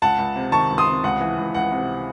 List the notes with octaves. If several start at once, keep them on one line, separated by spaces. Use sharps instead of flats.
C#2 F#5 A5
C#2
C3
D#3 A5 C#6
C#2
C6 D#6
C3
C#2 F#5
E3
C#2
C#2 F#5
C3